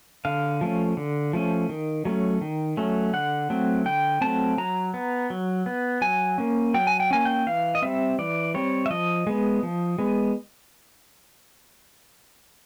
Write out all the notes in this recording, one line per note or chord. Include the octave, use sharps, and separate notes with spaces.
D3 F5
F3 A3 C#4
D3
F3 A3 C#4
D#3
F#3 A3 C#4
D#3
F#3 A3 C#4
D3 F#5
F#3 A3 C4
D3 G5
F#3 A3 C4 A5
F#3 A#5
B3
F#3
B3
F#3 G#5
A#3 C#4
F#3 G5
G#5
G5
A#3 C#4 G#5
G5
E3 F5
D#5
G3 C4 E5
E3 D5
G3 C4 C#5
E5
F3 D#5
G#3 B3
F3
G#3 B3